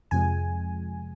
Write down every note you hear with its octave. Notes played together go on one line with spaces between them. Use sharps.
F2 C3 F3 G#3 G#5